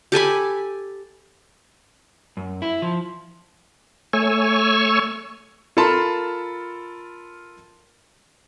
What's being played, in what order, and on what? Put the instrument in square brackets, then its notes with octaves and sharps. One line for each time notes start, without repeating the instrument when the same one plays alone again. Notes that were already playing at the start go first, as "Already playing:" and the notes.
[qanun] G4 A4 G#5 B5
[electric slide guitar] F#2
E4
F3
[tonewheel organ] A3 C#5 G#5 C#6 E6
[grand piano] F4 A4 A#4 A5 B5 C6